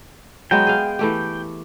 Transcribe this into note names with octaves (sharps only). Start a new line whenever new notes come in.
F#3 G#3 B3 G5
G#4 F5
E3 A3 G4